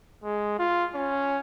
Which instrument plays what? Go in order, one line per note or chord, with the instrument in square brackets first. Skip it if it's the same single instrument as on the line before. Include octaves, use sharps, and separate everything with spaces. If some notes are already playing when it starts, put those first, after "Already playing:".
[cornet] G#3
F4
C#4